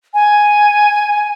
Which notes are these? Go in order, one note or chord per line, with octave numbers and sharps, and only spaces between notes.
G#5